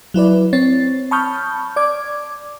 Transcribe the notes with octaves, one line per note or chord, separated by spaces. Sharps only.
F#3 E4 B4 D5
C4 C#5 A6
A5 B5 C#6 D#6 F6 G6
D5 D6 G#6